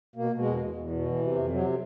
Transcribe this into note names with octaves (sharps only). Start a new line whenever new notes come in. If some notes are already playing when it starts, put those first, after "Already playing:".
B2 A#3
B2
G#3
E2
E2
E2
B2
E3
C3
F2
C3 F#3